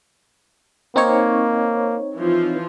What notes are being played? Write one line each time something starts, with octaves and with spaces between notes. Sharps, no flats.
A#3 C4 D#4 C#5
E3 F3 F4